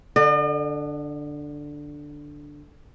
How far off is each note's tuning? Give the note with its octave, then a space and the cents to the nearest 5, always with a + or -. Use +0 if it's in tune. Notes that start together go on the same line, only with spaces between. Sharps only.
D3 +0 D#5 -45